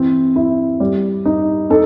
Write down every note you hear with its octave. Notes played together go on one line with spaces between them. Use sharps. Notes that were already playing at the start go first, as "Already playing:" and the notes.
Already playing: E3 C4
E4
G3
D#4
D#4 A4